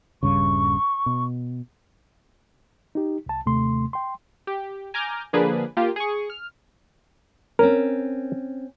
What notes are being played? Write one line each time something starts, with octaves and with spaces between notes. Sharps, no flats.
D#1 G2 C#3 C#6
B2
D#4 G4
C2 A5
D#2 C3 A3 C6
G5 C6
G4
G#5 A#5 D6 F6 G6
D3 F3 A#3 D4 G#4 B4
A#3 F4 G4
G#4 C#6
F6
C4 C#4 A#4